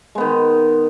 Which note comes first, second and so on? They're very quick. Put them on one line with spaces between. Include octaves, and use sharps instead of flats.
G#3 B3 D#3